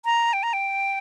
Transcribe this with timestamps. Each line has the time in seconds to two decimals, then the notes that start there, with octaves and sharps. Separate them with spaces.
0.05 A#5
0.33 G5
0.43 A#5
0.53 G5